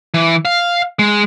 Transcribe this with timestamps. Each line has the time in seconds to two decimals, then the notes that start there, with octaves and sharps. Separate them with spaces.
0.14 E3
0.45 F5
0.99 G#3